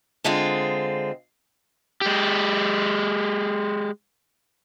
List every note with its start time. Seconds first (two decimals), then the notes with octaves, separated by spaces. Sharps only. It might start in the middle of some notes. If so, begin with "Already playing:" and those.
0.24 D3 G#3 C4 F4
2.01 G#3 G4